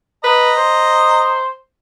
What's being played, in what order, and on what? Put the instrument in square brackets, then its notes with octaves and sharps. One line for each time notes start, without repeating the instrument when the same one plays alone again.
[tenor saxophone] B4 [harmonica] D#5 A#5
[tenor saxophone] C5